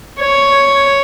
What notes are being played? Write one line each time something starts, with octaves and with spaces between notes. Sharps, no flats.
C#5